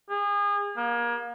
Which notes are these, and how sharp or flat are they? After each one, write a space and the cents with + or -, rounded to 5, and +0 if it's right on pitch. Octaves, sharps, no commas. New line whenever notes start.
G#4 -35
A#3 +30